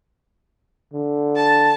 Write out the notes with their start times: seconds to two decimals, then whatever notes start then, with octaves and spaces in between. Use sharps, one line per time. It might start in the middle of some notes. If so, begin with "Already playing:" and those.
0.93 D3
1.36 A5